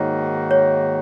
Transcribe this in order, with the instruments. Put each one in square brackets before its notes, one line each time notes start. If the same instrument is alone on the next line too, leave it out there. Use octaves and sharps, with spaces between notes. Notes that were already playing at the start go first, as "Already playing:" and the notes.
Already playing: [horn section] G#2 D#3 A#3 D#4 F#4 [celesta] C#5 D#5
[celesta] C#5